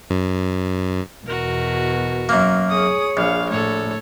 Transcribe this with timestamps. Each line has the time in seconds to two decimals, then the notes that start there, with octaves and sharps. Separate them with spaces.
0.10 F#2
1.26 E2 B2 F#4 A#4
2.29 F#2 A#3
2.70 G#4 C#5 D#6
3.17 A#1 F5
3.50 A2 A4 C#5